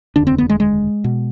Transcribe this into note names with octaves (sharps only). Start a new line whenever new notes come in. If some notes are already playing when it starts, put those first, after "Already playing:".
F1 D#2 D3 D4
C4
B3
G#3
G#3
B2